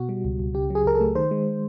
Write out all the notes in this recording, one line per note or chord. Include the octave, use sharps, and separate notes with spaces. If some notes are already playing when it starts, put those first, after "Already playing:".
Already playing: B2 F#4
G3
C#2
C#2
C#3 G4
F#3 G#4
C#2 A#4
A4
A3
D#3 C5
G#3